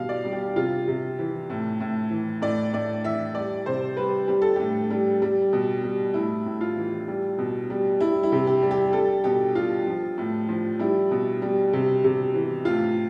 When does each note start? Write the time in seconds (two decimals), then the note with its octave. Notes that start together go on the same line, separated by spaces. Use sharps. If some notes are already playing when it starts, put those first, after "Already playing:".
Already playing: B2 G3 F5
0.09 D5
0.25 G3
0.33 G4
0.56 C3 F4
0.88 C3
1.19 E3
1.50 A2
1.80 A2
2.11 E3
2.42 A2 D5
2.73 A2 D5
3.04 E3 E5
3.35 G3 D5
3.66 C3 C5
3.97 G3 B4
4.28 G3 G4
4.42 A4
4.56 A2 G4
4.90 G3
5.22 G3
5.53 B2
5.84 G3
6.14 A2 E4
6.46 A2
6.61 F4
6.76 E3
7.08 G3
7.38 B2
7.70 G3
8.00 G3 E4
8.23 E4
8.32 C3
8.47 G4
8.62 G3
8.71 G4
8.93 G3 A4
9.24 B2 G4
9.55 G3 F4
9.87 F3
10.18 A2
10.49 F3
10.79 G3 E4
11.11 B2
11.42 G3
11.73 C3
12.04 C3
12.34 E3
12.65 A2 F4